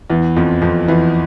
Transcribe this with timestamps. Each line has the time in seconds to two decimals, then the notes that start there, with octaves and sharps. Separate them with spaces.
0.10 E2 E3
0.36 F2 F3
0.62 F2 F3
0.88 E2 E3